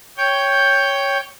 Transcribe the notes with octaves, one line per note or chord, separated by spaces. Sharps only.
C#5 G5 G6